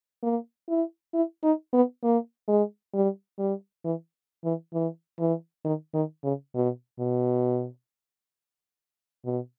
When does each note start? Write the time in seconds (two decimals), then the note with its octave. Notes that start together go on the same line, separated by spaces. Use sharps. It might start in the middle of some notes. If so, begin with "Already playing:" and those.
0.23 A#3
0.69 E4
1.14 E4
1.43 D#4
1.73 B3
2.03 A#3
2.48 G#3
2.94 G3
3.39 G3
3.84 E3
4.44 E3
4.73 E3
5.19 E3
5.64 D#3
5.94 D#3
6.23 C#3
6.55 B2
6.99 B2
9.25 B2